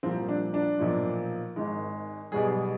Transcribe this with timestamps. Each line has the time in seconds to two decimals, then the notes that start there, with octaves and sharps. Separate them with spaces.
0.03 C2 A#2 F3 C4
0.29 D4
0.54 D4
0.79 B1 A#2 F3
1.56 G#1 G#2 D#3 G#3
2.32 B1 B2 G3 G#4